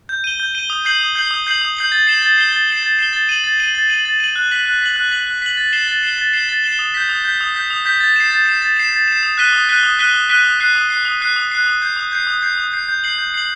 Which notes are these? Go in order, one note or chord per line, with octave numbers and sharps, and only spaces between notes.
G6
D#7 G7
G6
D#7 G7
D#6
G6 C7 F#7
D#6
G6 C7 F#7
D#6
G6 C7 F#7
D#6
G6 C7 F#7
A6
C7 E7 G7
A6
C7 E7 G7
A6
C7 E7 G7
A6
C7 E7 G7
A6
D#7 F#7
A6
D#7 F#7
A6
D#7 F#7
A6
D#7 F#7
F#6
B6 F#7
F#6
B6 F#7
F#6
B6 F#7
F#6
B6 F#7
A6
C7 E7 G7
A6
C7 E7 G7
A6
C7 E7 G7
A6
C7 E7 G7
D#6
G6 B6
D#6
G6 B6
D#6
G6 B6
D#6
G6 B6
A6
C7 E7
A6
C7 E7
A6
C7 E7
A6
C7 E7
D#6
F#6 B6 D#7 G7
D#6
F#6 B6 D#7 G7
D#6
F#6 B6 D#7 G7
D#6
F#6 B6 D#7 G7
D#6
F#6 C7
D#6
F#6 C7
D#6
F#6 C7
D#6
F#6 C7
D#6
G6 C7
D#6
G6 C7
D#6
G6 C7
D#6
G6 C7
G6
C7 F#7
G6
C7 F#7